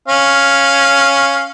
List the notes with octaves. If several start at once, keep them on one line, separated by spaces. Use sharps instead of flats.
C#4 F5